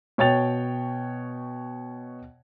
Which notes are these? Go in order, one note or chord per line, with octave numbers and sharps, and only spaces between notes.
B2 C#5 G5 A6 F7